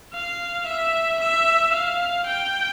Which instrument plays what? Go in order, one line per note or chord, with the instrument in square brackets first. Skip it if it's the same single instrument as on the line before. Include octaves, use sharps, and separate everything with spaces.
[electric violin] F5
E5
E5
F5
G5